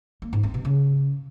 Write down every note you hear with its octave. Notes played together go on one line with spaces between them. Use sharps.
A#3
G#2
C4
B2
C#3